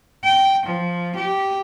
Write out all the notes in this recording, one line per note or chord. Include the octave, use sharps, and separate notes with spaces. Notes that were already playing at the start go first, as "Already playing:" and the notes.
G5
F3
G4